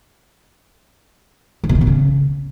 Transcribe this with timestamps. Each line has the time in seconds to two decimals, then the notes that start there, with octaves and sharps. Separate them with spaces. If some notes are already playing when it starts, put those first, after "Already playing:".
1.64 D#3
1.69 B2
1.75 D#3
1.81 B2
1.87 C#3